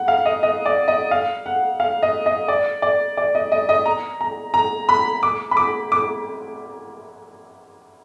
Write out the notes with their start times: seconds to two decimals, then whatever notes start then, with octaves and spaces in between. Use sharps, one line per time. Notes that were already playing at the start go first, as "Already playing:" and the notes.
Already playing: F#5
0.08 F5
0.26 D#5
0.43 D#5
0.66 D5
0.88 D#5
1.11 F5
1.46 F#5
1.80 F5
2.03 D#5
2.26 D#5
2.48 D5
2.82 D5
3.17 D5
3.35 D#5
3.52 D#5
3.69 D#5
3.86 A#5
4.21 A#5
4.54 A#5
4.89 B5
5.23 D6
5.51 B5
5.57 D6
5.92 D6